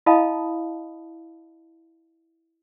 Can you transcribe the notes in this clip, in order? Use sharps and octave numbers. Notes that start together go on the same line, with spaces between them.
E4 D#5 F5 A5 B5 D#6